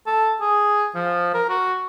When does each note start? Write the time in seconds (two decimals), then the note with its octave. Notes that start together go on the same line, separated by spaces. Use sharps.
0.07 A4
0.41 G#4
0.95 F3
1.34 A#4
1.49 F#4